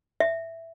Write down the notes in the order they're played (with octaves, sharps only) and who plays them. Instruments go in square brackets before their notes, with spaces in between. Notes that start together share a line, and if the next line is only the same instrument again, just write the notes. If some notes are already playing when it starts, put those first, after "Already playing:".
[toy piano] E5